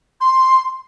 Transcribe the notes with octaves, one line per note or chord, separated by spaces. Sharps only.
C6